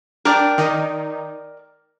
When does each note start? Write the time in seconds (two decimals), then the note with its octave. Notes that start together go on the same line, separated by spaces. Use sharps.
0.25 D4 A#4 D5 G5
0.58 D#3 D#4